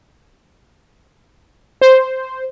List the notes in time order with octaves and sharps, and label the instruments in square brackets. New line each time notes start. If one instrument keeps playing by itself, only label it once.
[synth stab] C5